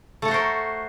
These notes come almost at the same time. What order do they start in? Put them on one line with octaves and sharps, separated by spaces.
A3 A4 F#4 C5 A#4